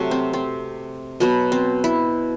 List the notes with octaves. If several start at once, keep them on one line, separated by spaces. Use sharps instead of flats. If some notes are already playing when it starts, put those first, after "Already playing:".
Already playing: C3 F#3 A3
C4
C4
B2 F#3 B3
C4
E4